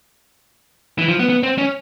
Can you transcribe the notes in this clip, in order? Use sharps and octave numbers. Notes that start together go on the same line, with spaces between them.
E3
F3
B3
B3
C4
C#4